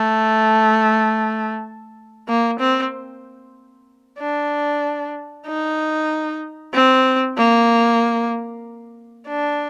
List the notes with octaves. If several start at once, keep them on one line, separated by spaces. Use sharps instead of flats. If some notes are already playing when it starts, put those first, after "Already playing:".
Already playing: A3
A#3
C4
D4
D#4
C4
A#3
D4